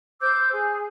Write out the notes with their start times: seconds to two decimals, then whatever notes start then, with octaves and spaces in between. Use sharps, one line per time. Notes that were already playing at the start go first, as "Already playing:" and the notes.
0.21 C5 D6 E6 G6
0.51 G#4